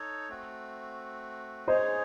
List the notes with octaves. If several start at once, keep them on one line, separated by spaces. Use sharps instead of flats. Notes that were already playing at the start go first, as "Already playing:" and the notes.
Already playing: D#4 A4 C#5
A3 C4 F#4
G#3 D#4 G#4 C5 C#5 D#5